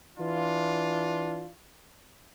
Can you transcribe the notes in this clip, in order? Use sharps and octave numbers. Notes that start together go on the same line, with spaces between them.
E3 D4 F4